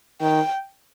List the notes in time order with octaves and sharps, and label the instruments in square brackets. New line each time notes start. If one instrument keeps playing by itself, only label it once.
[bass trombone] D#3 [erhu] G5